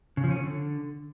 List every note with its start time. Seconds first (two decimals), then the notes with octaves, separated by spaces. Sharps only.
0.17 C#3
0.24 F3
0.30 C#4
0.37 D3